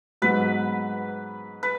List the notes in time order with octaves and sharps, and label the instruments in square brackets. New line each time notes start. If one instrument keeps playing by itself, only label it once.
[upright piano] G#2 F#3 B3 [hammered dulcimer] B4
[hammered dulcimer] B4